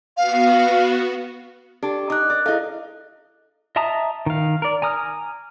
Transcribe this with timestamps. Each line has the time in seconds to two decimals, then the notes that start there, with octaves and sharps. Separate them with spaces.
0.17 B3 F#4 F5
1.83 D4 G4 A4
2.10 D#4 D6 F#6
2.30 A#4 D5
2.46 E4 G#4 A4 D#5 F5
3.76 D#5 E5 A5 A#5 D#6
4.26 D#3 F5
4.62 A#4 D5
4.82 G#5 A#5 D#6 F6